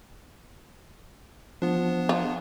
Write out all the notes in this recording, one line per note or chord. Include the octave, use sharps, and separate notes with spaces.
F3 B3 D4
F4